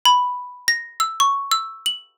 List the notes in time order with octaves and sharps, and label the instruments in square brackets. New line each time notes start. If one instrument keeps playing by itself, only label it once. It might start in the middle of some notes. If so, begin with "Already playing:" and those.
[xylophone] B5
A#6
E6
C#6
E6
F#7